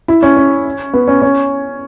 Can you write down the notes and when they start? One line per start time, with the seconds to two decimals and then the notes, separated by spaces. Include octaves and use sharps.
0.08 E4
0.23 C#4
0.37 C#4
0.94 B3
1.08 C#4
1.22 C#4